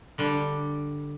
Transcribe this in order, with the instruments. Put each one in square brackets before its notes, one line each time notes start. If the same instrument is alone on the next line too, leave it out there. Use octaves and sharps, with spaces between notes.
[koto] D3 G3 D4